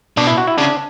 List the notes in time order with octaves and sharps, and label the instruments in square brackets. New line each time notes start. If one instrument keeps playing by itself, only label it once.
[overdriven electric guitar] B2 [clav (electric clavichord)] D4
[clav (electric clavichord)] E4
F#4
E4
[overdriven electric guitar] C#3 [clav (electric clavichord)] D4